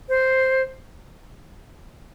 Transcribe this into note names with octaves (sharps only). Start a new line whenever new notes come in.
C5